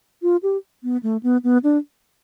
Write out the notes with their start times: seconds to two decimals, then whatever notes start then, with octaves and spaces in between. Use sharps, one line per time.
0.23 F4
0.43 G4
0.83 B3
1.03 A3
1.23 B3
1.44 B3
1.64 D4